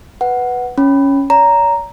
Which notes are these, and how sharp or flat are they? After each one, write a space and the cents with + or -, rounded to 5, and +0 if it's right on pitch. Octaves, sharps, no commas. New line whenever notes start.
B4 +0 F#5 +0
C#4 +0 B5 +0
C#5 +45 A#5 +0